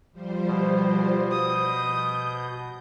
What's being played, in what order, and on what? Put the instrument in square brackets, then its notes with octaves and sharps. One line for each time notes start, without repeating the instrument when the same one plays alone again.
[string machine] F3 G3 C5
[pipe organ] B2
[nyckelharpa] D#6 [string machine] G6